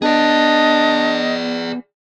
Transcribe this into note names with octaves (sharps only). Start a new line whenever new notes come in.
B3 D4 G#4 D5 D#5